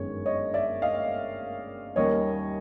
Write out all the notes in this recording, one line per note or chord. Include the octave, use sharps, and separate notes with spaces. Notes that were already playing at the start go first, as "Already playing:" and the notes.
Already playing: G1 F#2 D#3 G#3 C#5
C#5 D#5
D5 E5
D#5 F5
D#2 D#3 G3 A#3 C#4 C#5 D#5